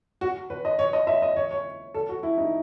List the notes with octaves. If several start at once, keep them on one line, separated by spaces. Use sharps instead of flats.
F#4
B4
D#5
C#5
D#5
E5
D#5
C#5
C#5
A4
F#4
E4
D#4